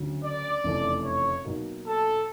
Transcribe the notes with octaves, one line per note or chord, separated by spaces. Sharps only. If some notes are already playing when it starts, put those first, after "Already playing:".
Already playing: D2 C#3 F#3
D5
F1 E2 C#3 E3 A3
C#5
B2 F#3 A#3 D#4
A4